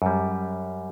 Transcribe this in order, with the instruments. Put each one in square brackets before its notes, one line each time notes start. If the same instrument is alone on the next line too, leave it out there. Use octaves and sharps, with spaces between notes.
[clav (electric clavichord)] F#2 G3